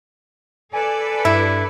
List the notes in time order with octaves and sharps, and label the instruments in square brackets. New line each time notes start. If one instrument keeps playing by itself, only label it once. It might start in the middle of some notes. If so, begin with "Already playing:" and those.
[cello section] A4 B4 D5 [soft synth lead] G#5
[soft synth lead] G2 [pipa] E4